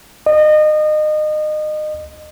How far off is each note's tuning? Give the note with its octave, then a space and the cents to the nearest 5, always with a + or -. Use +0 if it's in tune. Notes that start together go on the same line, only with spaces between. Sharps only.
D#5 -30